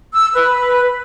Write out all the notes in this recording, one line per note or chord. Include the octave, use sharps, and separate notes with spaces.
E6
B4